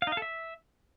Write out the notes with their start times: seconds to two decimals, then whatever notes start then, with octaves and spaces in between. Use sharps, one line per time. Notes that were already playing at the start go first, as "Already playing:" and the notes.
0.02 F5
0.07 D#4
0.12 F5
0.17 A4
0.22 E5